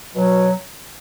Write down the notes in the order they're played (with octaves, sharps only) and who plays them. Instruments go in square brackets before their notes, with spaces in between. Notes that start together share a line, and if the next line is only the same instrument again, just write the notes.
[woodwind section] B2 F#3